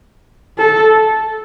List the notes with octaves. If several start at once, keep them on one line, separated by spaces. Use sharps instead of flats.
A4